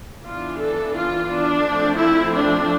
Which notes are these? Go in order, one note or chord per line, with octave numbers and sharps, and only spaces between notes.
E3 B3 D4 F4
A4
F4
D4
F3 A3 C4
E4
D4